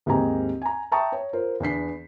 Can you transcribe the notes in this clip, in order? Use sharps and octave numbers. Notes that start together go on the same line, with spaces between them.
D#2 G#2 C4 G4 G#5 A#5
G#5 A#5
E5 G5 A5 A#5 C#6 D#6
C#5
F4 A#4 C5
E2 B3 D4 B6 C7